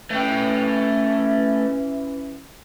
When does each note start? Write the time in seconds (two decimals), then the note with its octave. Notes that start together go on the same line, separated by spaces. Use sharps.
0.10 E3 A3 C#4 G5